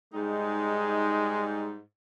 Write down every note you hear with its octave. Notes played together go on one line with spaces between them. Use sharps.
G#2 G3 G#3 D#4